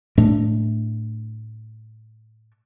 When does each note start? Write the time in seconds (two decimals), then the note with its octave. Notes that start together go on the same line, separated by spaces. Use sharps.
0.18 A2 A3 D4